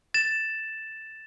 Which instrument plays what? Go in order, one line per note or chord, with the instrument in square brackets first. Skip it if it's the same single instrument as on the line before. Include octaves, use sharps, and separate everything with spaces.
[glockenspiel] A6 E7